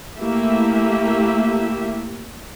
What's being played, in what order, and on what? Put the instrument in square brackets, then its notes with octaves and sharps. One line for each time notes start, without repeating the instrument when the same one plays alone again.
[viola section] A3 A#3 E4 G4 E5